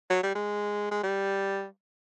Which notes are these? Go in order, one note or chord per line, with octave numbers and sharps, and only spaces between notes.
F#3
G3
G#3
G#3
G3